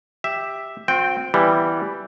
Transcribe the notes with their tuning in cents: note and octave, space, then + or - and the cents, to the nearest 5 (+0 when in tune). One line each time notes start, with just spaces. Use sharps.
G4 +5 E5 +0
C4 +0 F#4 -45 G5 +0
E3 +5 G3 +0 B3 +10